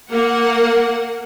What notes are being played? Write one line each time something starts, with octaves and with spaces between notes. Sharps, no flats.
A#3 F#5